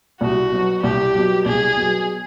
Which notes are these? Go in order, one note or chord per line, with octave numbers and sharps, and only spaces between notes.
C2 F#4
B2 F#3
C2 G4
B2 F#3
C2 G#4
B2 F#3